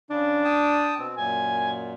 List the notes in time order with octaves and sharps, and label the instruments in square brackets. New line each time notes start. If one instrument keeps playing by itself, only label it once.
[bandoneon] C#3 [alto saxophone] D4
[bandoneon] G5 A5 D#6
B2 C4
[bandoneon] F#2 A#2 [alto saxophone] G#5